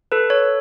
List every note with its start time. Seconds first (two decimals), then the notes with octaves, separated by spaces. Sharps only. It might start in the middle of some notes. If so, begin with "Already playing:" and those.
0.12 A4 B4
0.30 C#5